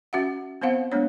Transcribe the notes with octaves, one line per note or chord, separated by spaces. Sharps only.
C#4 F#4 E5 F#5
B3 C4 C5 F5 F#5
G#3 A#3 B3 D4 C#5